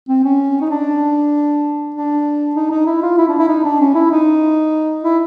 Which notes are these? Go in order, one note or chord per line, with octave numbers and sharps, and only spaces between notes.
C4
C#4
D#4
D4
D4
D#4
D#4
E4
F4
E4
D4
E4
D#4
D4
C#4
E4
D#4
E4